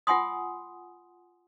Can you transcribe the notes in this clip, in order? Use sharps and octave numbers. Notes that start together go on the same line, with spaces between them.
F4 F#5 G#5 C6 D#6